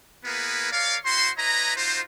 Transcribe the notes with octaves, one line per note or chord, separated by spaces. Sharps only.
A#3 B3 E4 G#4 A#4 B4
A#4 C#5 D5 F5
E4 F#4 C5 C6
E4 B4 C#5 D#5 A#5
D#4 F4 F#4 C5